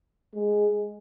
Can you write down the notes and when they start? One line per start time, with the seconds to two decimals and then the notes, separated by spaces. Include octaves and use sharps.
0.34 G#3